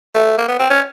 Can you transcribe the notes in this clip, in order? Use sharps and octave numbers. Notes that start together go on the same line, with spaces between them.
A3
A#3
B3
C4
C#4